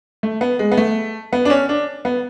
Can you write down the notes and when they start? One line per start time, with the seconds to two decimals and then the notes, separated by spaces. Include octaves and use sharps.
0.23 A3
0.41 B3
0.59 G#3
0.72 B3
0.77 A3
1.33 B3
1.45 D4
1.50 C#4
1.69 D4
2.05 B3